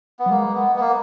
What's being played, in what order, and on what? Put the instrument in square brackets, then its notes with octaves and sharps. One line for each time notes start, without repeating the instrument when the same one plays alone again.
[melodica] B3
[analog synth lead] F#3
[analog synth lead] G#3 [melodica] A#3
[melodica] B3
B3
A#3